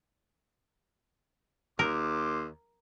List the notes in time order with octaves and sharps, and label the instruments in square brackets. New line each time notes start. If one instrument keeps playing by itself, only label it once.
[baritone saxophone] D#2 [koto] A#4 [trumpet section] C6 D6